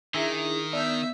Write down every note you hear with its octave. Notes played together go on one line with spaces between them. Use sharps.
D#3 D4 E4 G#4 E5 G#5 A#5
B3 D4 E5 E6 G6